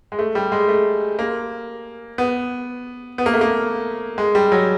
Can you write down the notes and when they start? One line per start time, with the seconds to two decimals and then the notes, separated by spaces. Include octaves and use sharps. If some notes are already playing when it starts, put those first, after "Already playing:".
0.12 G#3
0.19 A3
0.35 G3
0.52 G#3
0.69 A3
1.19 A#3
2.18 B3
3.18 B3
3.26 A#3
3.34 A3
3.41 A#3
4.18 G#3
4.35 G3
4.52 F#3